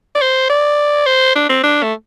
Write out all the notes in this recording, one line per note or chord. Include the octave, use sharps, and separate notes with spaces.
D5
C5
D5
C5
D4
C4
D4
A3